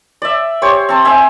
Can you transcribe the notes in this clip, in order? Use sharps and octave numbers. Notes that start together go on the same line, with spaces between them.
D5 E5
G4 C5 C#5
C4 A5
C5 E5 G#5